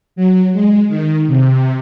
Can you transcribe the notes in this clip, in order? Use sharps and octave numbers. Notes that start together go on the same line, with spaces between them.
F#3
G#3
D#3
C3